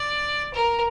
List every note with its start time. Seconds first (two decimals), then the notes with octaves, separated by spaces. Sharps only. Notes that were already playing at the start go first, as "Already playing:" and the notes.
Already playing: D5
0.54 A#4